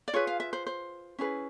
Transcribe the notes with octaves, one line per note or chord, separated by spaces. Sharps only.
D5
F4 G#4 B4 C#5
F5
E5
C5
C5
C#4 E4 G#4 B4